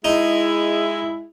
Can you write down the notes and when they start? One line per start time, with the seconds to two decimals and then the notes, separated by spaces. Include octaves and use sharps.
0.04 G#3 D#4 E4